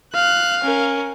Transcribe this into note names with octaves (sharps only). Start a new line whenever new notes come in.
F5 F#6
C#4 A#4